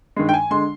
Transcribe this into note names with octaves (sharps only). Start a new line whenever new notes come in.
G2 D#3 G#3
G5
G#5
D3 G#3 C6